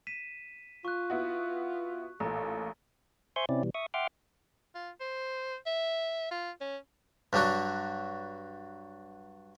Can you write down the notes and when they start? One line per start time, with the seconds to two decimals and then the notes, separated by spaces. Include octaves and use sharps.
0.07 B6 D#7 E7
0.85 F4 C#6 F#6
1.10 B3 E4 F#4
2.20 A1 A#2 A4 A#5
3.36 C5 E5 G#5 C6 C#6 G6
3.49 C3 C4 C#4 E4 D5
3.63 B2 E3 G3
3.75 E5 C#6 D#6
3.94 E5 F#5 G5 C6 D6 F6
4.75 F4
5.01 C5
5.66 E5
6.31 F4
6.61 C#4
7.33 G2 F#3 D4 F#4